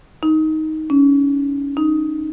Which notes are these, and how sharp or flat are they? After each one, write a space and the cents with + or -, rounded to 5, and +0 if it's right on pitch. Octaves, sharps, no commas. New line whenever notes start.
D#4 +10
C#4 +20
D#4 -5